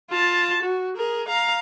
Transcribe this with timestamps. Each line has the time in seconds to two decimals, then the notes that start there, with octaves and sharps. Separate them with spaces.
0.10 F4 A5
0.63 F#4
0.97 G#4 A#4
1.28 F5 A#5